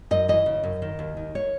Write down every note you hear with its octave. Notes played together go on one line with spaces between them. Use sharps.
F#2 D#5
E3 D#5
C#3
F#2
D#3
D#2
D#3
C#5